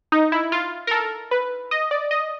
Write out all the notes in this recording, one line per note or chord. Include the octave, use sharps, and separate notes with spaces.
D#4
E4
F4
A#4
A4
B4
D#5
D5
D#5